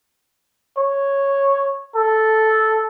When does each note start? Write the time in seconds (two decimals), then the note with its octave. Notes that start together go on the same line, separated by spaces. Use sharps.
0.78 C#5
1.96 A4